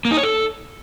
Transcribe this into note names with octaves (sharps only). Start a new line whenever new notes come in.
A#3
D#4
C#5
A4